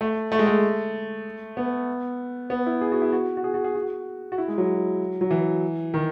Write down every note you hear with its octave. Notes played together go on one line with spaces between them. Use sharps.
A3
A3
G#3
A3
B3
B3
E4
G#4
F#4
E4
F#4
F#4
G#4
F#4
G#4
F#4
F#4
E4
G#3
F#3
F#3
E3
D#3